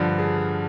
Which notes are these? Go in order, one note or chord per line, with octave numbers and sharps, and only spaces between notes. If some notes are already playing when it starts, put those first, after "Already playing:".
Already playing: G2 D3 F3
G#4